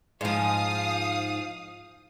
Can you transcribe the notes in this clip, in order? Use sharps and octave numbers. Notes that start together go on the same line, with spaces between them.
G#2 F3 F5 D#6